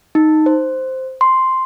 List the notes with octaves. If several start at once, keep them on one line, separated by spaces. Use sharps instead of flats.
D#4
C5
C6